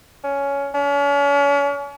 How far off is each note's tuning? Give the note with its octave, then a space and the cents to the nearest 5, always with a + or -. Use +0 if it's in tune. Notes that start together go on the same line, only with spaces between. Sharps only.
C#4 +15
C#4 +40